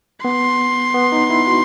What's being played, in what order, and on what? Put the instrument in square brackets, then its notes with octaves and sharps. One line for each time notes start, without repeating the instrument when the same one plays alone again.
[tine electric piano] B3 [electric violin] C6
[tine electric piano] B3
D#4
E4
F#4